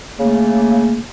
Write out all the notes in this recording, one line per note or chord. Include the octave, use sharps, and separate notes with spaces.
C#3 A3 A#3